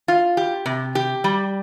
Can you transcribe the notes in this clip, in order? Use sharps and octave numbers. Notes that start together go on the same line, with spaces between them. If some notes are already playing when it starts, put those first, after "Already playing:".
F4
G4
C3
G4
G3